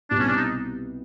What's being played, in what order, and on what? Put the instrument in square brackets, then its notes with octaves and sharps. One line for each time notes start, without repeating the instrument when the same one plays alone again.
[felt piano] C2 B2 G3 B3 [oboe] D4
[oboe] C#4
D4
D#4